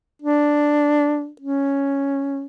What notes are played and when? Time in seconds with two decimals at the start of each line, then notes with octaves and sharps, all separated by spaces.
0.22 D4
1.41 C#4